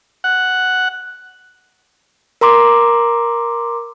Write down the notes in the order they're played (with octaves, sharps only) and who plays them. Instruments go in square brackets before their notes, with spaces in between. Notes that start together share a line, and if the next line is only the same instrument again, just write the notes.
[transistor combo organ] F#5
[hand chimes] A#4 A#5 C6 D6